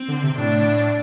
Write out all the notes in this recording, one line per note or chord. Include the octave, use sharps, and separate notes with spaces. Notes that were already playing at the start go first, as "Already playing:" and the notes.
Already playing: C4
D3
C3
C3
A2 D4